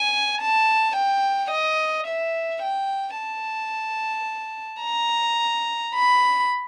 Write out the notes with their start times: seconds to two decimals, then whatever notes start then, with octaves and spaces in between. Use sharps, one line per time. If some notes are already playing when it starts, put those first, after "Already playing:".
Already playing: G#5
0.41 A5
0.96 G5
1.51 D#5
2.07 E5
2.62 G5
3.17 A5
4.83 A#5
5.95 B5